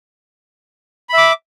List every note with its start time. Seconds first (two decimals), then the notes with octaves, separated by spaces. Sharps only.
1.09 B5
1.13 E5
1.18 D6